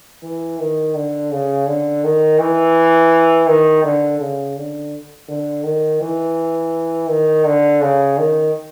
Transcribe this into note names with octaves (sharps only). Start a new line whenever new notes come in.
E3
D#3
D3
C#3
D3
D#3
E3
D#3
D3
C#3
D3
D3
D#3
E3
D#3
D3
C#3
D#3